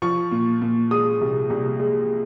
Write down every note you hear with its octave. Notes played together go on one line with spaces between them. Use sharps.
F3 C#6
A#2
A#2
G#3 D#6
C2
C2
G#3